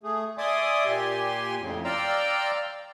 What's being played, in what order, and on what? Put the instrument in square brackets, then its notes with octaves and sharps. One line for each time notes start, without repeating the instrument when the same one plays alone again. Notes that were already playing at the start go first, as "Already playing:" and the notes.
[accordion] A3 G#4
D5 E5 G#5 C6 D6 D#6
A#2 G4 G#5 C6
F2 A2 C#3
D5 F5 G5 A#5 C6 E6